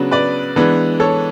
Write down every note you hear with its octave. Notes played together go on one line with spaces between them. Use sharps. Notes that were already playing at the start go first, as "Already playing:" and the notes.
Already playing: C#3 F#3 B3 D4
B4 D5
E3 G#3 B3 D4
A4 C#5